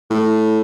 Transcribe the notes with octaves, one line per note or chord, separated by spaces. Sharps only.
A2